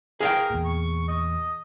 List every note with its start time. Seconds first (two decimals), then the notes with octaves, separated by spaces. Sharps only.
0.20 G#4 A#4 F5 G5
0.50 E2 A#2
0.65 C#6
1.08 D#5